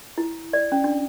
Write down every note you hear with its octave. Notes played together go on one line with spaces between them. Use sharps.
E4
D5
C#4
D4